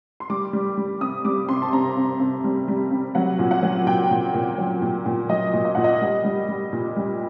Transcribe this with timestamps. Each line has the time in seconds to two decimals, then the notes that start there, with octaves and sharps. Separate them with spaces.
0.20 C6
0.30 G3 D6
0.53 G3
0.77 G3
1.01 C3 D#6
1.25 G3 D6
1.49 C3 C6
1.62 A5
1.73 C3 A#5
1.97 C3
2.19 C3
2.44 G3
2.68 G3
2.91 C3
3.15 F#3 F#5
3.39 A#2
3.51 F#5
3.63 F#3
3.86 A#2 G5
4.11 A#2
4.34 A#2
4.58 F#3
4.82 A#2
5.06 A#2
5.29 F#3 D#5
5.54 A#2
5.65 D#5
5.75 A#2 F#5
5.84 D#5
6.02 G3
6.24 G3
6.49 G3
6.73 A#2
6.97 G3